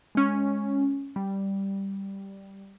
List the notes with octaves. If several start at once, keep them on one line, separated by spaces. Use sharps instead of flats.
G#3 C#4
G3